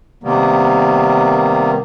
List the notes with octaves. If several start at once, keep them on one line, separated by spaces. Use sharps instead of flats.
C3 D#3 G3 A#3 B3